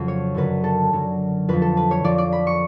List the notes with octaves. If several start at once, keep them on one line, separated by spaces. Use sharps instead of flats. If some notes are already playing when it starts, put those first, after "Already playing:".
Already playing: F2 C#3 F#3
C#5
F#2 D3 F#3 B4
A4
F#2 D3 F#3
F2 F3 B4
A4
B4
C#5
F2 F3 D5
D5
B5
C#6